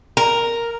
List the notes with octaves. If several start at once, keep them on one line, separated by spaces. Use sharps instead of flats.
A#4